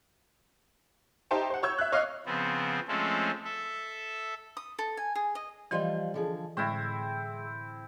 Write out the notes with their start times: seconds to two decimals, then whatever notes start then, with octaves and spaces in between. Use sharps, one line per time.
1.31 D#4 G4 C5 E5 G5 A5
1.50 C5 F#5
1.63 C#5 C#6 E6 G6 G#6
1.79 E5 F#6
1.92 C#5 D#5 F5 D6 F6 C7
2.26 C#3 F3 B3 C4
2.88 F3 G#3 A3 C4 C#4 A4
3.44 A4 E5
4.57 D#6
4.79 A4
4.97 G#5
5.15 G#4
5.35 D#5
5.71 E3 F3 G3 D#5 F5 C6
6.14 D3 F3 G#4
6.57 A2 D3 G#3 C4 E4